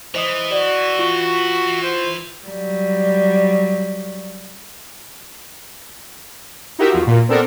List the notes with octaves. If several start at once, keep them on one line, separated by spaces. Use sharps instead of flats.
E3 C5 D#5 D#6
F#4 D5
F4 C#6
C5
F#3 G3
D#4 E4 F#4 G4 A#4 E5
E2 F3 F#4
A#2 A#3
B3 C4 D4 A4 A#4